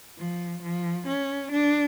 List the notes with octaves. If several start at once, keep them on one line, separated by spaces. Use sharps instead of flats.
F3
F3
C#4
D4